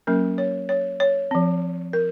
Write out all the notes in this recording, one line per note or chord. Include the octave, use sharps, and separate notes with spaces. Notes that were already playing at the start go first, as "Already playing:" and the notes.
F#3 A#3 C#4 A#4
C#5
C#5
C#5
F3 C4
A#4